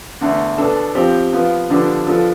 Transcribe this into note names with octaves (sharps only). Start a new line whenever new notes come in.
E2 D3 A3
B2 B3 D4 A4
F3 C4 G4
F3 B3 F4
D3 F3 B3 D4 G4
F3 B3 D4 F4 A4